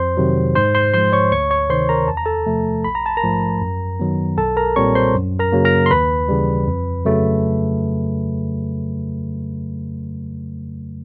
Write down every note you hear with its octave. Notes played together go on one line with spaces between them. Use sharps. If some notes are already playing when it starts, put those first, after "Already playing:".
Already playing: F2 C5 C6
C3 D#3 F#3
G#2 C5 C6
C5 C6
F3 G#3 C5 C6
C#5 C#6
D2 C#5 C#6
C#5 C#6
C3 D#3 C5 C6
A#4 A#5
E2 A5
A#5
A4 A5
C3 F3 A3
A#1 B5
A#5
A5
A#4 A#5
G#2 F3 A3
F#2
D#3 F#3 B3
B1 A4 A5
A#4 A#5
A#2 G3 C4 C#5 C#6
C5 C6
F#2
A#4 A#5
C#3 F#3 A#3
A#4 A#5
C6
D#2 B4 B5
C#3 E3 G3
F2
C#3 F#3 A3